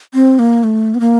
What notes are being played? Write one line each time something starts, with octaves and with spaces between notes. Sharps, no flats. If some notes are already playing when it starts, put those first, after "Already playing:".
C4
A#3
A3
B3
A#3